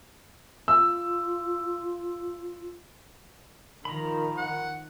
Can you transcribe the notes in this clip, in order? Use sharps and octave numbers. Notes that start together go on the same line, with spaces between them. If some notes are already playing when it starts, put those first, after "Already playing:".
F4 E6
D#3 F3 A#5 B5
F#5